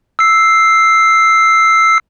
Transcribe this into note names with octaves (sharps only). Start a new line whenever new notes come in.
E6 C7